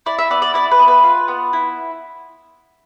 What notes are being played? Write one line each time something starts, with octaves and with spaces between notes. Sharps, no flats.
E4 D5
E5
B3 D5
D5
E4 D5
B4
B3
B4
F4
B3
E4